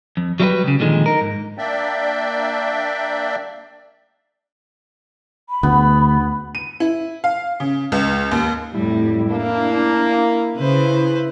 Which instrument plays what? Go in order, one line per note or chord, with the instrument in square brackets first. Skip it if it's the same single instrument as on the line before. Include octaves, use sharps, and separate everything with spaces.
[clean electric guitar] F2
F#3 G3 D#4 E4 G4 B4
C#2 C#3
A#2 D3 D#3 F3 G#3
D#4 A#4
G#2
[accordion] A#3 D4 D5 E5 G5
[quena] B5
[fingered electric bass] D2 [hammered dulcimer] B3
[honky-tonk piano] D#7
E4
F5
C#3
C#2
D#2
[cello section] F2 A2 G3 [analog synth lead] E4
[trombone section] A#3 [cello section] D4
[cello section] C#3 [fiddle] B4 C5